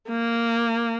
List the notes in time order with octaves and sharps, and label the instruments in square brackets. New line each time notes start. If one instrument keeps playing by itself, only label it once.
[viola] A#3